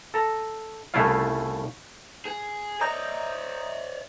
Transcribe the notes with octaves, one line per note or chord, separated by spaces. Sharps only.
A4 A#5
C2 C#3 A3 E4 F4 F5
G#4
C#5 D5 A#5 D#6 G6